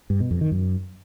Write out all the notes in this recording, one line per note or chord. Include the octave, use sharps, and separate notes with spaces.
G2
B2
F2
D#3
F#2